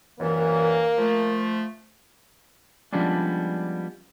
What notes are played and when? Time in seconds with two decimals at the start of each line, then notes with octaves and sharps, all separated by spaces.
0.20 C2 F#2 E3 A#3
0.98 F3 A3
2.93 F3 G3 G#3 B3 C#4 D4